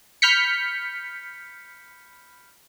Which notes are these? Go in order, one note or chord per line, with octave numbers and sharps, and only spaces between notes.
B5 F6 G6 B6 C#7